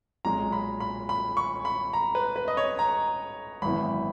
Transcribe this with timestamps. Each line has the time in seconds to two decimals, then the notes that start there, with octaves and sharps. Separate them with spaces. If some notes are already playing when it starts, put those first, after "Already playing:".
0.25 B1 A#2 G#3 A#5
0.52 B5
0.80 B5
1.09 B5
1.37 C#6
1.65 B5
1.93 A#5
2.15 B4
2.36 B4
2.48 D#5
2.57 C#5
2.79 A#5
3.62 G#1 F#2 E3 B3 E4 B5